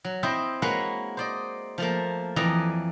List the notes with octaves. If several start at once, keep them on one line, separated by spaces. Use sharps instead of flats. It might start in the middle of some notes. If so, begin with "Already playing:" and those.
F#3
C4 E4 C5 D#5 E5 G5
G#3 A#3 F#4 B4 C#5
C5 D5 D#5
F3 A3 A#3
F2 E3 D5 D#5 A#5